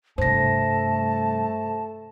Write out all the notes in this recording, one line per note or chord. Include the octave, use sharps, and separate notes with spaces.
G2 C3 A3 C5 A5 A#6